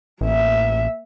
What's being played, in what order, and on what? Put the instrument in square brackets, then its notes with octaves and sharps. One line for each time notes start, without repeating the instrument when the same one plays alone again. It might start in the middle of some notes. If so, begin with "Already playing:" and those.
[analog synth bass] A1 [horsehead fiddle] A#3 E5